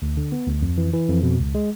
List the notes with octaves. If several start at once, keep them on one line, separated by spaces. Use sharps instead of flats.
D2
D3
B3
D2
F2
E3
E3
F2
B2
C#2
G#3